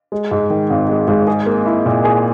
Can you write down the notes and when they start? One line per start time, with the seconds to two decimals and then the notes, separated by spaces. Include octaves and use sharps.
0.12 G#3
0.31 G#2
0.50 D#3
0.70 G#1
0.89 G#3
1.08 G#2
1.27 G#4
1.46 A#3
1.66 E4
1.86 A#2
2.05 G#4